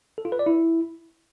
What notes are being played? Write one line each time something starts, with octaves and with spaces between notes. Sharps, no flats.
A4
F4
B4
D5
E4